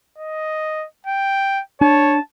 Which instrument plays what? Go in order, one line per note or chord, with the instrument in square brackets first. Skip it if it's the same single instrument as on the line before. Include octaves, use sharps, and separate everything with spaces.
[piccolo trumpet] D#5
G5
[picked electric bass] D4 [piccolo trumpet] C#5 [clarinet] A5